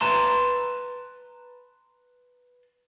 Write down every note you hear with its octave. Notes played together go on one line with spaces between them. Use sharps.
B4 A5 A#5 C6